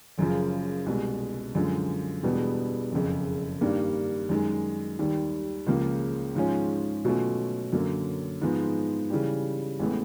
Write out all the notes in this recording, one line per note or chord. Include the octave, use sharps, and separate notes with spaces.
F#1 F#2 C#3 F3
C2 B2 G#3
F#2 D3 F3 G#3
E1 E2 B2 G3 B3
F#1 F2 C#3
G2 D#3 G3 A#3 D4
F#2 D#3 G#3
D#2 D#3 G3
C#2 C#3 F3 A#3
G#2 F3 G#3 C#4 F4
B2 F#3 A3 C#4 F4
F#2 D3 F#3 A#3
G#2 F3 G#3 B3
C#3 E3 G3
A1 A2 E3 G#3 B3